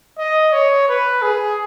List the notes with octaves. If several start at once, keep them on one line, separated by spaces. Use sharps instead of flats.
D#5
C#5
B4
G#4